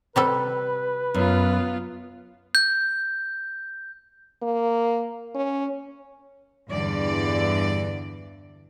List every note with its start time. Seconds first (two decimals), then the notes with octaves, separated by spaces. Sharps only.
0.16 C3 G3 A4 B4
1.14 F#2 B3 F4
2.55 G6
4.42 A#3
5.35 C#4
6.70 E2 G2 D3 E3 D5